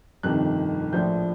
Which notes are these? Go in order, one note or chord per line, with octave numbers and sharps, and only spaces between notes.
G1 F2 C3 D#3 F#6
A#1 A2 F3 G6